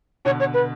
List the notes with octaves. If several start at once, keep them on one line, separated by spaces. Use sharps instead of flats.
B2 D3 C#5
C#5
B4